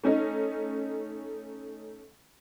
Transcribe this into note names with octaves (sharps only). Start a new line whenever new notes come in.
A3 C#4 D#4